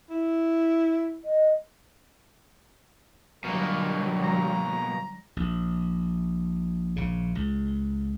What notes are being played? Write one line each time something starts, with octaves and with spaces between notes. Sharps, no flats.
E4
D#5
B2 D3 F#3 G3 A#3 A#4
A#5
A#1
A#1 C#3
C#2